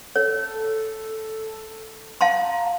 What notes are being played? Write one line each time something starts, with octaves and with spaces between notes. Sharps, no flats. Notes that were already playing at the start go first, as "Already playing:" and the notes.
A4 C#5
F5 A5 A#5 C6